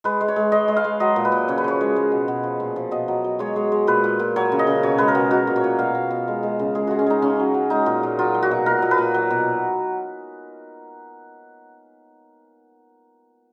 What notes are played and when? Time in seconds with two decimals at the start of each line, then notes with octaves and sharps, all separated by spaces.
0.04 G#3 B4
0.21 G#3
0.28 C#5
0.36 G#3
0.52 G#3 D#5
0.68 G#3
0.77 F5
0.84 G#3
1.00 F#3 D#5
1.16 A#2
1.25 B4
1.32 A#2
1.48 C#3 C#5
1.58 B4
1.64 F3 C#5
1.81 G#3
1.96 G#3
2.12 B2
2.28 B2
2.43 F3
2.60 A#2
2.76 F3
2.91 B2 D#5
3.08 F#3
3.24 F#3
3.39 G#3 C#5
3.56 G#3
3.72 G#3
3.87 A#2 B4
4.04 A#2
4.19 A#2
4.36 F#3 C#5
4.52 C#3
4.59 D#5
4.67 C#3
4.83 B2 C#5
4.98 G#3 B4
5.08 A#4
5.15 B2
5.31 F#3 F#4
5.47 A#2
5.56 C#5
5.64 A#2
5.79 B2 F5
5.95 B2
6.11 B2
6.28 G#3
6.43 G#3
6.59 C#3
6.75 G#3 G#4
6.87 G#3 F#4
6.99 C#4
7.06 G#3 D#4
7.22 C#3 C#4
7.39 F#3
7.54 F#3
7.70 G#3 D#4
7.86 A#2
8.03 A#2
8.19 F#3 F4
8.34 F#3
8.43 F#4
8.51 B2
8.66 A#2 A#4
8.82 A#2
8.91 B4
8.98 A#2
9.14 F#3
9.31 B2